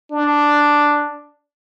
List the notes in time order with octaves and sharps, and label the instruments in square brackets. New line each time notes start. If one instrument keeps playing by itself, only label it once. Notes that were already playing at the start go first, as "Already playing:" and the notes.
[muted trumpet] D4